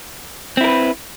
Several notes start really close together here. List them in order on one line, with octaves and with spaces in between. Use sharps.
C4 E4 A#4 B4